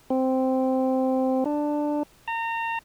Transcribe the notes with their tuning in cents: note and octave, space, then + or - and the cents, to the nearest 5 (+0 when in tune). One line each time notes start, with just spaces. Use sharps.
C4 -5
D4 +10
A#5 -30